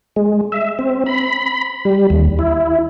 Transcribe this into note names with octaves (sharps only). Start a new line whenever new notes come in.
G#3
E5
C4
B5
G3
D#2
E4